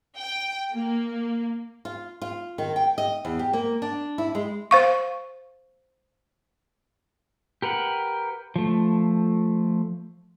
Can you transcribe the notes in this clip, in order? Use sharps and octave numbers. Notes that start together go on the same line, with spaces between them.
G5
A#3
F4
F4
D#3
G5
D#5
E2
G4
A#3
D4
E4
G#3
C5 F5 C#6
G4 A#4 B4 F#5
F3 A3